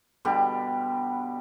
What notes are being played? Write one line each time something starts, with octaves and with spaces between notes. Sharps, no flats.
B2 D3 G3 G4